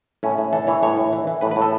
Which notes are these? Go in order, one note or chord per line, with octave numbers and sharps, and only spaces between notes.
A2 C#4
A2
E3 A4
E3 C#5
A2 C#5
A2
E3
E3
A2 B4
A2 B4
A4